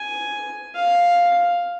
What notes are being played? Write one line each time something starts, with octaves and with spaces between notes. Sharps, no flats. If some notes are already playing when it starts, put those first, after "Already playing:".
Already playing: G#5
F5